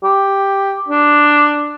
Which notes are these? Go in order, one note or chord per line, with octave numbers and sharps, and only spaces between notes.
G4
D4